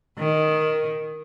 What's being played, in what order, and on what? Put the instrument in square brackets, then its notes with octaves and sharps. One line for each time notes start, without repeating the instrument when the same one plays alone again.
[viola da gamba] D#3